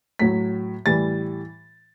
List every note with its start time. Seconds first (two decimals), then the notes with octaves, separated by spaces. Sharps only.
0.19 A2 F#3 B6
0.86 A2 E3 G3 A6